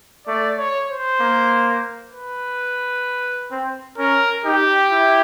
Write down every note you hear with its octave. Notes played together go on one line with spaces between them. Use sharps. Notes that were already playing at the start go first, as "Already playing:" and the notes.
A3 D5
C#5
C5
A#3
B4
C4
C#4 A#4
D#4 G4
E4